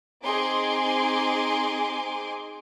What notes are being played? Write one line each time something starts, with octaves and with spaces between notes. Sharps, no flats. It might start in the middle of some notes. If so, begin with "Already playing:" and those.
C4 D#4 G#4 G#5 C6 D6